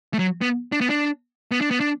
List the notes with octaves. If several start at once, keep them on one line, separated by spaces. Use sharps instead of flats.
A3
F#3
B3
D4
B3
D4
B3
D4
B3
D4